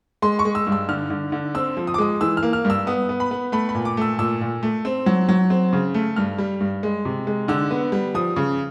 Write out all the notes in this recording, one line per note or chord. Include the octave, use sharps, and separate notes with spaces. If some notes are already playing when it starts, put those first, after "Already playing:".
G#3 C6
C#6
G#3
E6
G2
E6
D3 F6
D3
D3
C4 E6
F3
D#6
D6
G#3 D#6
E3 E6
F6
A#3
F6
G2
E6
B3 D#6
B3
B5
B3
A3 B5
B5
A#2
D6
A3 E6
A#2 E6
A#2
A3
C4
F#3
F#3
C4
C#3
A3
G2 F6
G3
G2
G#3
C3
G#3
D3 E6
B3
G3
F3 D#6
C#3